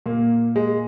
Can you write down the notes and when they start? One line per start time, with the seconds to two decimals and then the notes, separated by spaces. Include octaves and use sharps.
0.06 A#2 A#3
0.56 G#3